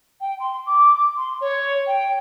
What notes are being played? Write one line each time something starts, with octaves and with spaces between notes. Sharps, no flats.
G5
C6
D6
C6
C#5
G5